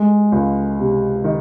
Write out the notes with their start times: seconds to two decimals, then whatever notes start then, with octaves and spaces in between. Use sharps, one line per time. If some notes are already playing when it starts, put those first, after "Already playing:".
Already playing: G#3
0.32 C#2
0.79 C3
1.24 D#3